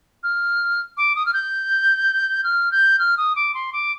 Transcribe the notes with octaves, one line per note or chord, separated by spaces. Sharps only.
F6
D6
D#6
F6
G6
F6
G6
F6
D#6
D6
C6
D6